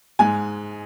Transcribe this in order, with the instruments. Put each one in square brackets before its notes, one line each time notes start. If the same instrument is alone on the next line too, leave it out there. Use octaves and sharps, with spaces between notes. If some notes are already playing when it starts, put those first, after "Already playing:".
[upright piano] G#2 G#3 G#5